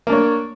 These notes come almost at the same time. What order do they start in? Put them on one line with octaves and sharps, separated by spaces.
A#3 D4 C#5